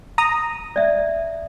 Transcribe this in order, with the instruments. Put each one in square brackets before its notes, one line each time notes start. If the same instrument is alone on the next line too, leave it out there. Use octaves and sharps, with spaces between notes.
[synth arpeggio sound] A#5 D#6
[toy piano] D5 E5